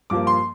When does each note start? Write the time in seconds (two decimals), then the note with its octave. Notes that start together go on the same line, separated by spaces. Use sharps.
0.10 G2 F3 A#3 D6
0.27 C6